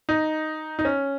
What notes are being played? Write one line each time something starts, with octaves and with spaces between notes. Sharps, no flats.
D#4
D#4
C#4